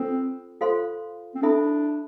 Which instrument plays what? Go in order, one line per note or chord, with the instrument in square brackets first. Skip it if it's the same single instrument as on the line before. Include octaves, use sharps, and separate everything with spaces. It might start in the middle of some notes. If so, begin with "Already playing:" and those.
Already playing: [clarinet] C4 [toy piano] F4 A4 C5
[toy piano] F4 A4 C5 F5 C6
[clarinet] C4
[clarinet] D4 [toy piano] E4 A4 E5 B5